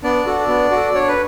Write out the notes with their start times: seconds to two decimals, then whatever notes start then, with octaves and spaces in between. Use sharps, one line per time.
0.03 B3 D4 D5
0.26 F#4 A4
0.48 B3
0.71 F#4 A4
0.94 D4 C#5
1.08 B4